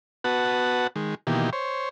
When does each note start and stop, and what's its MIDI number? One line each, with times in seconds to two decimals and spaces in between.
0.24 0.87 59
0.24 0.87 66
0.24 0.87 71
0.24 0.87 78
0.24 0.87 81
0.96 1.15 51
0.96 1.15 56
1.27 1.50 47
1.27 1.50 51
1.27 1.50 52
1.27 1.50 58
1.27 1.50 67
1.53 1.89 72
1.53 1.89 73